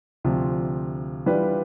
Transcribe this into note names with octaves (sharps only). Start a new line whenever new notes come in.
D2 C3 F3
E3 G3 D4 F4 B4